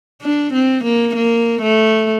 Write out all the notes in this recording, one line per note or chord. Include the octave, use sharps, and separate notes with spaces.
D4
C4
A#3
A#3
A3